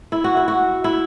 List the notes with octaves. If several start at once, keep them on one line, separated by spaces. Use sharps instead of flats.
E4
F#4
E4
F#4
E4